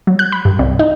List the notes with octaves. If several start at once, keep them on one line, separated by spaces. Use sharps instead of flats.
F#3
F#6
B5
G2
C2
D#4